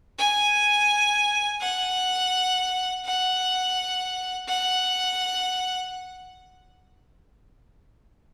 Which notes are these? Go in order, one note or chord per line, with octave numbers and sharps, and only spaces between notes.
G#5
F#5
F#5
F#5